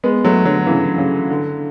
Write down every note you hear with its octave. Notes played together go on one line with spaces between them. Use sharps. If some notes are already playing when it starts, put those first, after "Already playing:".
G#3 B3
F#3 A3
D3 F#3
C#3 E3
C#3
D3